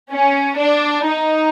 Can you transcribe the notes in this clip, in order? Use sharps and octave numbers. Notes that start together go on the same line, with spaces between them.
C#4
D4
D#4